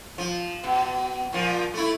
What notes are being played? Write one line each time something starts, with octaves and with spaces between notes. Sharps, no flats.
F3
B2
A#2 F3
A3 E4